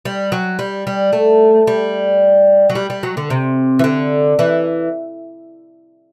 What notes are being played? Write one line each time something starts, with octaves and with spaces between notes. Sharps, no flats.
G3
F#3
G3
G3
A3
G3
F#3
G3
G3
F#3
D3
C3
E3
D3
E3